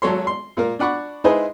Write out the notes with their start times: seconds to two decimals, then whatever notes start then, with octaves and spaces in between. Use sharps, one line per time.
0.02 G#1 F#3 A4 C#5 C6
0.27 C6
0.57 A#2 A#3 A#4
0.79 D4 D5 F#5 B5 C#6
1.24 G#3 D#4 E4 G#4 B4 C5